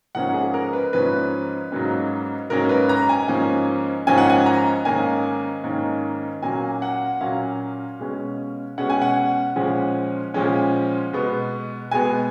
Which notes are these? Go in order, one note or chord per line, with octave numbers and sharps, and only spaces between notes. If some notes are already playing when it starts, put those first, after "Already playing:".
G#2 F3 A#3 C#4 F#5
G#4
A#4
B4
G#2 F3 A#3 C#4 B4
G#2 F#3 A#3 C#4
G#2 F#3 A#3 C#4 A#4
B4
A#5
G#5
G#2 F3 A#3 C#4
G#2 F3 A#3 C#4 G#5
F#5
G#5
A#5
G#2 D#3 A#3 C#4 G#5
G#2 D#3 A#3 C#4
A#2 F#3 A#3 C#4 G#5
F#5
A#2 F#3 A#3 C#4 F5
B2 G#3 C#4
B2 G#3 C#4 F#5
G#5
F#5
A#2 F3 G#3 C#4
A#2 F3 G#3 C#4
B2 G#3 B3
B2 G#3 B3 G#5